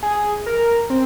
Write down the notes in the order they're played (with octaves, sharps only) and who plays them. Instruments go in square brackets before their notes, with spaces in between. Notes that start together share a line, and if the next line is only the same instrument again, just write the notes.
[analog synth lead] G#4
A#4
C4